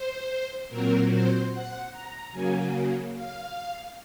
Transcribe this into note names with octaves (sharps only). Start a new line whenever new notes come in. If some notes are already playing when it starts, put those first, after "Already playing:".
Already playing: C5
A#2 F#3 C4 A#4
C5
F#5
A#5
C#3 F#3 A#3 G#5
F5